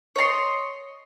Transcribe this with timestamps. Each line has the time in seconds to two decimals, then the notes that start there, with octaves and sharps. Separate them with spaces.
0.16 C#5 D#5 A#5 C6